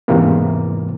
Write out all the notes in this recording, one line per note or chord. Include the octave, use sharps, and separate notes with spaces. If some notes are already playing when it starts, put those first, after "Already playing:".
E2 G#2 C3 E3 A#3